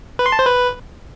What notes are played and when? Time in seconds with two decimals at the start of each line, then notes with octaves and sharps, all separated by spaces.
0.19 B4
0.26 C6
0.32 A5
0.39 C5
0.46 B4